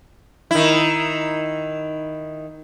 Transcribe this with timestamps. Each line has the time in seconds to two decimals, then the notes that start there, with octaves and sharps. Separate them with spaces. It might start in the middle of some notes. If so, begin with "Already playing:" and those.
0.51 D#3 E4